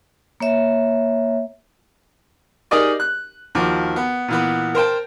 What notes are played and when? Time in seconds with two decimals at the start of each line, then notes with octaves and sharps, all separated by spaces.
0.40 A#3 C#5 E5
2.71 D#4 G4 G#4 A#4 D5 D#5
3.00 F#6
3.55 D#2 F3 F#4 D6
3.96 B3
4.28 A#2 E3 B3
4.75 A#4 C5 G5 A5